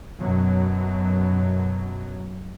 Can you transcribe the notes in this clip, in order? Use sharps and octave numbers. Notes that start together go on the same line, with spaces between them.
F#2 B2 F#3